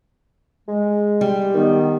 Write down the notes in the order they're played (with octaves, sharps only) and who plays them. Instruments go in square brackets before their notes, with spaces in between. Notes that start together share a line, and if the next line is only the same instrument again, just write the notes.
[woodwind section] G#3
[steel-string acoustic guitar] G3
[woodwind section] D#3 B3